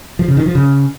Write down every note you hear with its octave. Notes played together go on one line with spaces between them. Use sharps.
F3
C#3
D#3
F3
C#3